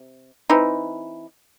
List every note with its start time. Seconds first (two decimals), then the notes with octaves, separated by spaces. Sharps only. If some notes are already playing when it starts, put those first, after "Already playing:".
Already playing: C3
0.49 E3 C4 D#4